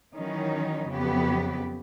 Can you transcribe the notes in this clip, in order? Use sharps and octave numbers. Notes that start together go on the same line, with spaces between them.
D#3 E3 F#3 C#4 D#4
F2 C#3 F#3 B3 G4 B4